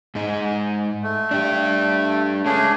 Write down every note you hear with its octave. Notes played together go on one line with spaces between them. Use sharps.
G#2 D#4
A3
D4 G4
G#3 A3 C#4 D4 G#4